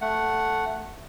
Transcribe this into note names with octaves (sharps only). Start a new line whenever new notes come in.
A3 F#5